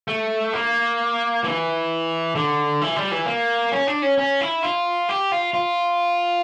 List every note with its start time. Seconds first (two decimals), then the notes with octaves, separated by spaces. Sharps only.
0.08 A3
0.53 A#3
1.44 E3
2.35 D3
2.81 E3
2.96 G3
3.11 E3
3.26 A#3
3.72 C#4
3.87 D4
4.02 C#4
4.18 C#4
4.41 E4
4.63 F4
5.09 G4
5.32 F4
5.54 F4